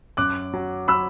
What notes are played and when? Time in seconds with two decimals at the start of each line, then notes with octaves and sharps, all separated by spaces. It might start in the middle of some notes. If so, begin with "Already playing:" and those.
0.17 F#2 D6 F#6
0.54 F#3
0.88 F#3 B5 E6